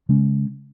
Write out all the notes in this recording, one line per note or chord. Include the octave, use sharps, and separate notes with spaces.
C#3 G#3 C#4